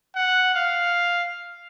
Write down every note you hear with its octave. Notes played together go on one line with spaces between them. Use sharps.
F#5
F5